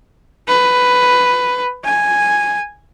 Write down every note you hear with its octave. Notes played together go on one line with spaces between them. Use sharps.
B4
G#5